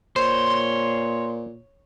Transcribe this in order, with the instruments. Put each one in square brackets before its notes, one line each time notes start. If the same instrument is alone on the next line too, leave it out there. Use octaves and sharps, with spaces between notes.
[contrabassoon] A#2 [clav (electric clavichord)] C5 [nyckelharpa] C#5 [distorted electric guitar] C6